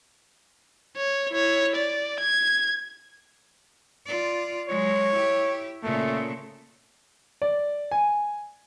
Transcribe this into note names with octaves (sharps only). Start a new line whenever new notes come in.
C#5
E4 C#5
D5
G#6
F4 D5
F#3 G#3 C#5
E4 G4
A#2 C#3 A3
D5
G#5